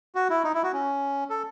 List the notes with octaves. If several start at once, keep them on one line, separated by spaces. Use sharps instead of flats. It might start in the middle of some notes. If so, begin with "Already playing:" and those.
F#4
E4
D#4
E4
F#4
C#4
A4